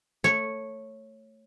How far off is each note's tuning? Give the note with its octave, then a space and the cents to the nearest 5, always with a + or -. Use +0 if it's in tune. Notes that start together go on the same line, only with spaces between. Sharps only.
A3 +10 C#5 -10